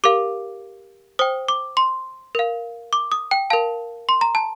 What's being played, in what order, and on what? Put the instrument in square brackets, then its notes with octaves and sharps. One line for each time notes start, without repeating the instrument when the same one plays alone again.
[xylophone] G4 A#4 F5 D6
C5 G5 D#6
D6
C6
A#4 F5
D6
D#6
G5
A#4 F5 A5
C6
A#5
A5